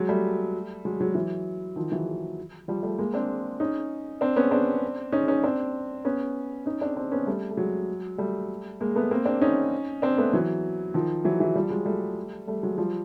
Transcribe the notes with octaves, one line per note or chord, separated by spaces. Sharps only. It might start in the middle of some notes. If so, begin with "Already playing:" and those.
Already playing: F#3 G#3
G3 A3
F#3 G#3
F#3 G#3
E3 F#3
D#3 F3
E3 F#3
F3 G3
G3 A3
G#3 A#3
C4 D4
C#4 D#4
C4 D4
B3 C#4
C4 D4
C#4 D#4
C#4 D#4
C4 D4
B3 C#4
C#4 D#4
C4 D4
C4 D4
B3 C#4
G3 A3
A3
F#3 G#3
G3 A3
G#3 A#3
A3 B3
A#3 C4
C4 D4
C#4 D#4
C4 D4
A3 B3
E3 F#3
D#3 F3
E3 F#3
E3 F#3
F3 G3
F#3 G#3
G3 A3
G3 A3
F#3 G#3
F3 G3